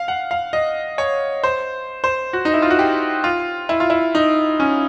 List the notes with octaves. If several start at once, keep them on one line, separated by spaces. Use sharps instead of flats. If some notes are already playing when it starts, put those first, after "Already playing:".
Already playing: F5
F#5
F5
D#5
C#5
C5
C5
F#4
D#4
E4
F4
F#4
G4
F4
E4
F4
E4
D#4
C#4